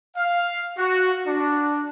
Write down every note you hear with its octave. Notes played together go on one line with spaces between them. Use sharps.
F5
F#4
D4